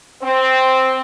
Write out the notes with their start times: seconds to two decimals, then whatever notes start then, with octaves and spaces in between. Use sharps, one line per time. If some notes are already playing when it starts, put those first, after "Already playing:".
0.23 C4